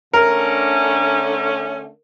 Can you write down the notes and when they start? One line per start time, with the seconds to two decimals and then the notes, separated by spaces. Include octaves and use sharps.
0.14 D3 A3 C#4 A#4